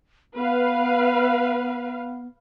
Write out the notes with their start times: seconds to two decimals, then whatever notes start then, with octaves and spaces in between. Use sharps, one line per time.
0.35 B3 B4 F5